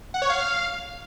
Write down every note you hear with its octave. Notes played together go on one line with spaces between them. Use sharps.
F#5
C#5
F5